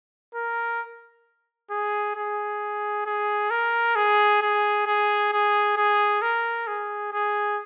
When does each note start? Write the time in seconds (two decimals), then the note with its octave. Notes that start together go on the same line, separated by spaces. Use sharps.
0.35 A#4
1.70 G#4
2.16 G#4
3.06 G#4
3.51 A#4
3.96 G#4
4.42 G#4
4.86 G#4
5.32 G#4
5.77 G#4
6.22 A#4
6.67 G#4
7.13 G#4